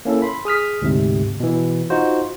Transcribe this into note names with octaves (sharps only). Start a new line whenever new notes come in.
A#3 C#4 E4 A4
B5 C6
G#4 D#6 F6 B6
D2 G#2 C3
B2 E3
D#4 F4 F#4 C5